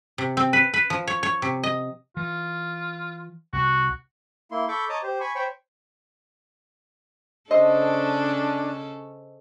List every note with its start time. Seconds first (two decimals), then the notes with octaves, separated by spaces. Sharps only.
0.18 C3
0.37 C4
0.53 B4
0.74 B4
0.90 F3
1.07 C#5
1.23 C#5
1.42 C3
1.63 D#5
2.17 E3 F4
3.53 C2 F#4
4.51 A#3 E4 C6
4.69 A4 B5 C#6 D6 G6
4.89 C#5 D#5 A5 A#5 D6 D#6
5.03 G4 C5
5.21 G#5 B5 C#6
5.35 C5 C#5 G5 B5 C#6
7.51 C#3 C#4 D4 A4 C5 D#5